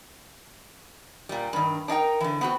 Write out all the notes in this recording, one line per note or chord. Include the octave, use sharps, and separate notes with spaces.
A#2 G3
G2 D#3
D4 D#4 A#4 G5
D3 E3
B3 C4 F#4